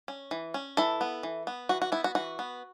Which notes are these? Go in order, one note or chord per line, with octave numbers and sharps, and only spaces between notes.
C#4
E3
C#4
E3 E4 A4
B3
E3
B3
E3 F#4
F#4
B3 E4
F#4
E3 F#4
B3